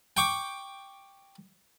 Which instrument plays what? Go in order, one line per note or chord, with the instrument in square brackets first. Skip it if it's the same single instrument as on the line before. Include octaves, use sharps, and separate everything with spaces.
[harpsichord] G5 C#6 D6